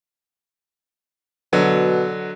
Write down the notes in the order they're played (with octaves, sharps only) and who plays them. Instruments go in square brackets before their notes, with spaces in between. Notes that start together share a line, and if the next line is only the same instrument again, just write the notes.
[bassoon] B2 [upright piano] D3 F#3